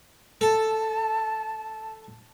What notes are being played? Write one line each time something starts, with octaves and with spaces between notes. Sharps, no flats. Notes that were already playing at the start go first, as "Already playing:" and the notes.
A4 A5